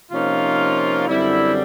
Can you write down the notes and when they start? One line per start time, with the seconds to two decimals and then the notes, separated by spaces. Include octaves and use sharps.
0.12 C3 F3 A#3 C#4 D#4 F4
1.08 F#2 D3 G3 C4 E4